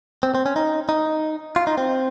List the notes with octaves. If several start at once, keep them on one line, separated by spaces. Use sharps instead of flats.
C4
C4
C#4
D#4
D#4
F4
D#4
C4